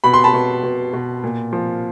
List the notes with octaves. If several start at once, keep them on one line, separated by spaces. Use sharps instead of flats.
B2 B5
C6
A5 B5
B2
B2
B2
A#2
F3